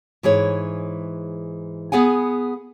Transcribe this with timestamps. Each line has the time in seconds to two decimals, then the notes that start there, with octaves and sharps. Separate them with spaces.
0.23 G#2 E3 G#4 C#5
1.92 B3 G#4 F#5 G#5